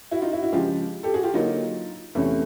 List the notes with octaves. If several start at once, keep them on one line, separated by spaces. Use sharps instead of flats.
E4 F#4
D#4 F4
E4 F#4
E4 F#4
C#3 F3 G#3 F4 G4
G4 A4
F#4 G#4
F4 G4
D3 F#3 A#3 D#4 F4
E2 C3 E3 A3 C#4